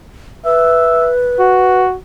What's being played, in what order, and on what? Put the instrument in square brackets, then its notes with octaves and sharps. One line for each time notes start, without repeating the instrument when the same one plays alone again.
[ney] B4 [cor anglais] E5
[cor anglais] F#4